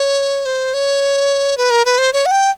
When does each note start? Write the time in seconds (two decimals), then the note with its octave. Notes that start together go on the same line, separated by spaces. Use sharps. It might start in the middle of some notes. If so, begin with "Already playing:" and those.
Already playing: C#5
0.45 C5
0.74 C#5
1.57 B4
1.70 A#4
1.85 B4
1.98 C5
2.13 C#5
2.26 F#5
2.31 G5